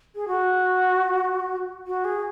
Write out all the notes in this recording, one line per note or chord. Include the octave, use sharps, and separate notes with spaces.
G#4
F#4
F#4
G#4